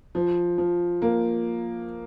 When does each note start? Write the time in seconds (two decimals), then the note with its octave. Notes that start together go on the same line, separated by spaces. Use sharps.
0.15 F3
0.58 F3
1.02 A#3